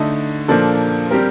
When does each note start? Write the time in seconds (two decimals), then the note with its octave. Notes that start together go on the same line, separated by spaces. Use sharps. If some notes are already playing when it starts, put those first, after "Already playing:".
Already playing: D3 A3 D#4
0.48 A#2 F3 A#3 D4 A4
1.11 G3 C4 G4 A#4